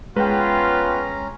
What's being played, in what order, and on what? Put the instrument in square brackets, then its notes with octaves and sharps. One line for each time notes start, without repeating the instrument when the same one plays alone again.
[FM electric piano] G#3 [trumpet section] B3 F4 [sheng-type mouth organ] C#4 A#5 [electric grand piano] B4 G5